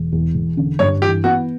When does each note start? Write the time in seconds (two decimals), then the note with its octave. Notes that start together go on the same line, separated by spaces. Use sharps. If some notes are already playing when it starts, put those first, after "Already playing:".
Already playing: E1
0.12 E2
0.34 E1
0.57 D3
0.79 G2 C#5
1.02 E3 G4
1.24 B3 F#4